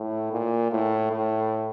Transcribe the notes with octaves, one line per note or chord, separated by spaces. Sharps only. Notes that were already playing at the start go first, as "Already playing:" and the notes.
Already playing: A2
A#2
A2
A2